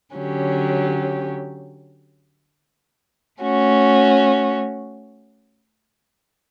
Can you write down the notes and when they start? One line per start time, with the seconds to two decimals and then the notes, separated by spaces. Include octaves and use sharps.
0.14 D3 F#3 C#4 G4
3.40 A3 C#4 F#4